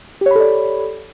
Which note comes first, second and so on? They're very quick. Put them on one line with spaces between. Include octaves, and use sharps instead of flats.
G4 C#5 B5 A4 D5